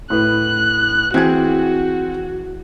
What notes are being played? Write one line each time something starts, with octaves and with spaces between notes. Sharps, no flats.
A2 B4 F#6
E3 C4 F#4 G#4 G#6